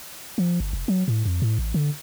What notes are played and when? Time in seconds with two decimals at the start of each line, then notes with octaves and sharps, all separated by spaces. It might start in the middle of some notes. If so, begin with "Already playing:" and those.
0.38 F3
0.60 G1
0.73 F1
0.88 F#3
1.08 A2
1.25 F2
1.42 A2
1.59 A1
1.74 D3